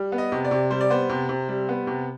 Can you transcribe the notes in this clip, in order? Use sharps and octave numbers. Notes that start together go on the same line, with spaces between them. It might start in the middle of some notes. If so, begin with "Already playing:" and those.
Already playing: G3
B3
D#5
C3
D5
C3
G3 C5
D5
B3 C5
C3
C3
G3
B3
C3